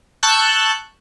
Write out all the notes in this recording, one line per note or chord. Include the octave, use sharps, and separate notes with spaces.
A5 C#6 E6 F#6 G6